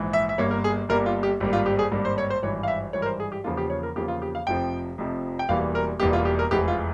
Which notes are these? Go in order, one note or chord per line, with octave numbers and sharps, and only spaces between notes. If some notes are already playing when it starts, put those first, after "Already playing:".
Already playing: A#1 G#2 E3
E5
E5
G1 G2 G3 A#3 C#5
A#4
G#4
G1 G2 G3 A#3 A#4
F4
G4
G#1 G2 G3 A#3
F4
G4
G#4
G#1 G2 G3 A#3
C5
C#5
C5
G#1 G2 E3 C#5
F5
E5
G#1 G2 E3 C#5
A#4
C5
G#4
G4
E2 C#3 F3 A#3 F4
G4
C#5
A#4
E2 C#3 F3 A#3 G4
F4
G4
F5
F1 F2 C3 F3 G5
F1 F2 C3 F3
G5
E1 E2 E3 G3 A#3 F5
A#4
E1 E2 E3 G3 A#3 G4
F4
G4
A#4
F1 E2 E3 G#3 G4
F4